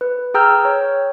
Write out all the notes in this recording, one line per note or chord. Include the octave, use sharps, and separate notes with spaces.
B4
G#4 G5 A#5 E6 F6 G6
C#5